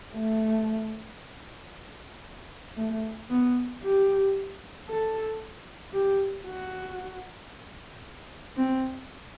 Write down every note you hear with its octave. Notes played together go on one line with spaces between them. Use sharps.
A3
A3
B3
G4
A4
G4
F#4
C4